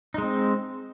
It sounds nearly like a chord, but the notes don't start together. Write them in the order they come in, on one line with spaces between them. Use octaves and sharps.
D#4 G#3 C4